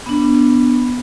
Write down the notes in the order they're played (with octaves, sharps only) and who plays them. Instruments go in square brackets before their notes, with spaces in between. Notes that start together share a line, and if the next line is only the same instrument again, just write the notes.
[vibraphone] B3 D4